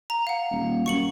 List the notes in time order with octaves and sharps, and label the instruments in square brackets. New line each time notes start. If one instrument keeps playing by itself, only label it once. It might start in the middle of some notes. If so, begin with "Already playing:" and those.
[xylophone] A#5
F5 F#5
[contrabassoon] D#1
[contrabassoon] F#2 [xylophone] C#6 C#7 F#7